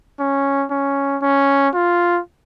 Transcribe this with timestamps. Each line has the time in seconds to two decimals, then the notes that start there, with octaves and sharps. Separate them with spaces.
0.20 C#4
0.71 C#4
1.23 C#4
1.74 F4